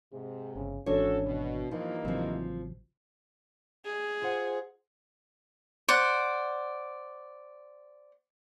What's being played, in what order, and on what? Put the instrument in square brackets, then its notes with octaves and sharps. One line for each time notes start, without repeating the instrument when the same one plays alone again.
[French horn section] G#2 C3 [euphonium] G#4
[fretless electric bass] G1 [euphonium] C#3
[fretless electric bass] G#1 G#2 E3 [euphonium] C#4 [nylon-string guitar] D4 C#5 [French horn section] F#4 A4
[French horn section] B2
[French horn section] G2 E3 A#3 [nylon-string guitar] F3 [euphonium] D#4
[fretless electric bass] A1 C#3 F#3 [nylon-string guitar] F3 C4
[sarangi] G#4
[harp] F4 C5 F#5
[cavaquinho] C5 D5 F#5